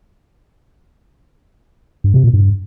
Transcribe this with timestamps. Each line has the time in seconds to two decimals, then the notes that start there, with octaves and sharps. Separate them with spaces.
2.04 G2
2.14 C3
2.24 A#2
2.33 G2